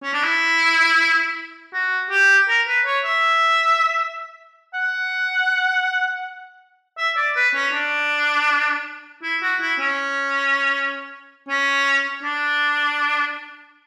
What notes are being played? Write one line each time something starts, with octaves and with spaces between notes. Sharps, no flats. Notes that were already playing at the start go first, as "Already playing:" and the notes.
C#4
D4
E4
F#4
G4
A#4
B4
C#5
E5
F#5
E5
D5
B4
C#4
D4
E4
F#4
E4
C#4
C#4
D4